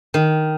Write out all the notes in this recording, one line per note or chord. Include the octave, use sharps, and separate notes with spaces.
D#3